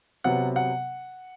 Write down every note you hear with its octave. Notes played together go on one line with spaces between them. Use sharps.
C3 F#3 B3 F#5
F#5